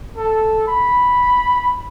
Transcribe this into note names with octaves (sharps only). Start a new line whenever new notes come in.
A4
B5